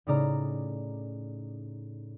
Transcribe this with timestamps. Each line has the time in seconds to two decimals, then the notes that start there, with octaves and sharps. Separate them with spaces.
0.07 A2 C#3 D#4 D5 A#5 F6